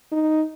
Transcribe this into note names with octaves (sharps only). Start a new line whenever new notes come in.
D#4